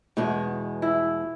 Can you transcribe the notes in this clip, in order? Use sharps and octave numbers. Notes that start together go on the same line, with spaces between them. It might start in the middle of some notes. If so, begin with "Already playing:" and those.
E2 B2 G#3 D#4
E4